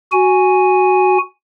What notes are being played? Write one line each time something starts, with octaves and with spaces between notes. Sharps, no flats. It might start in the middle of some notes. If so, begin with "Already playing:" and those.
F#4 G#5